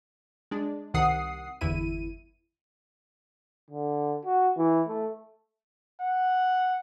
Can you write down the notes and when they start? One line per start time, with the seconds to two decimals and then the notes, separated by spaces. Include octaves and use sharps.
0.51 G#3 D4
0.94 C2 C3 D#3 F#5 D#6 C7
1.61 G1 E2 E4 D#7
3.70 D3
4.25 F#4
4.57 E3
4.88 A3
6.02 F#5